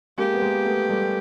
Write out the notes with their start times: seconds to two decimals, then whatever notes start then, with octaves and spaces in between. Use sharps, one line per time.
0.18 G#3 A#3 G4
0.33 B3
0.42 G#3 A#3
0.65 A3 B3
0.89 G3 A3